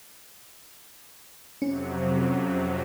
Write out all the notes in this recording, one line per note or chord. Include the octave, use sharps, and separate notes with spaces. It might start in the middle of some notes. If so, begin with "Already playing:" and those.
F2 C3 F#3 C#4